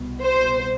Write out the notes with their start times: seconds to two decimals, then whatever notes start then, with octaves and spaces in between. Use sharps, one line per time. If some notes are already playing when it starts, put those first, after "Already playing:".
Already playing: C2 B2
0.22 C5